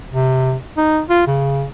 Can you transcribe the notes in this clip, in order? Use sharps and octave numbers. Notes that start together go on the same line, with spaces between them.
C3
D#4
F4
C#3